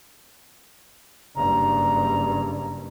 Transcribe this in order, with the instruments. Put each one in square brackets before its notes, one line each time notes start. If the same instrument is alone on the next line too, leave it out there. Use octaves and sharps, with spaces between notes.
[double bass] F#1 G2 [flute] A#5